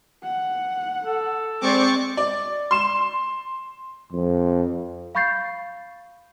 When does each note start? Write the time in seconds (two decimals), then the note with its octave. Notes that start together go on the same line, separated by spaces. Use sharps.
0.23 F#5
1.05 A4
1.61 G#3 C4 D5 C#6 D6
2.17 D5
2.71 C6 E7
4.12 F2
5.15 F5 B5 C#6 G6 A6 C7